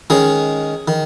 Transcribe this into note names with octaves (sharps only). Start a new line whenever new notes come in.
D#3 G#3 C#4 G#4
D#3